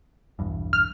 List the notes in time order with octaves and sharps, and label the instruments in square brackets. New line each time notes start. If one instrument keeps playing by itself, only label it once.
[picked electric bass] B1 E2 G2
[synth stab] F6